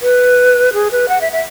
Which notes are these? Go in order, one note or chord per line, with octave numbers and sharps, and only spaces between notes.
B4
G#4
B4
F#5
E5
E5